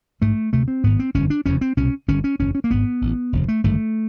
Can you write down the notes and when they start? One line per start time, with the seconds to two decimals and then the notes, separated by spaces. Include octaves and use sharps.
0.21 A#1 G#2 A3
0.53 D2 C3 A3
0.68 C4
0.84 G#1 G#2 B3
0.99 C4
1.14 G1 F2 D3 C#4
1.30 D4
1.46 F1 E2 C#3 C#4
1.61 C4
1.77 C2 B2 C#4
2.08 G1 G2 D3 C#4
2.24 C#4
2.39 F#1 E2 C#3 C#4
2.55 C#4
2.64 A#3
2.70 G#1 G#2 B3
3.01 A1 A2
3.33 F1 D#2 C#3
3.48 A3
3.64 G#1 G2 D3 A3